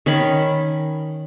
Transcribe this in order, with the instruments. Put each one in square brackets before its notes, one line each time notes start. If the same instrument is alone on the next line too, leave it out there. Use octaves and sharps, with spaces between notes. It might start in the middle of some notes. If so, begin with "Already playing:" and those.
[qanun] D#3 C#4 B5